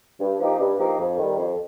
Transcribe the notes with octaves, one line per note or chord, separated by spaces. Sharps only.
G2
F3 A#3 D#4 G4
G2
F3 A#3 D#4 G4
F2
D#3 G3
F2